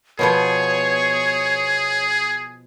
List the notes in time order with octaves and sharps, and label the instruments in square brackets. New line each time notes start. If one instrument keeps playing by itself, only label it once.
[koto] B2 F3 B3 [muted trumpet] G#4 [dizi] C#5